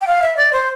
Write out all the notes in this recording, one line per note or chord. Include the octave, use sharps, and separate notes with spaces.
G5
F5
E5
D5
C5